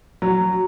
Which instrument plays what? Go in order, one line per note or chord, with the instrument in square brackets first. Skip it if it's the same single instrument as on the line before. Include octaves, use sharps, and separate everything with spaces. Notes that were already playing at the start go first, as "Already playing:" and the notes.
[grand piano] F#3